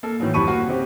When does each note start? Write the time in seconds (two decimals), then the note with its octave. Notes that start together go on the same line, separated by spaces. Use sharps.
0.03 A#3 A4
0.19 A2 D#3 E3 F#3 A#3
0.34 D1 F2 G3 B5 C#6 D#7
0.47 A#3 F#4
0.67 C#3 C4 G4